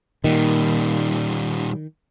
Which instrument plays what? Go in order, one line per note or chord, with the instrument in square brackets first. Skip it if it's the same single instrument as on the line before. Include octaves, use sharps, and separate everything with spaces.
[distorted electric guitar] A#2 G3 [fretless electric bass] D#3